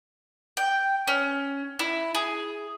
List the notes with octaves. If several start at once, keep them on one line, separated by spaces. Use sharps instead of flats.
G5
C#4
E4
G#4